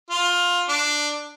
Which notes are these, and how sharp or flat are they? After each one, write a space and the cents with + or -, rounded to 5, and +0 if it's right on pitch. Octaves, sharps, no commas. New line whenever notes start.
F4 +15
D4 +5